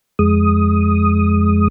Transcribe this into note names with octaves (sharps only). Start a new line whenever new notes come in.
F2 G#3 D#6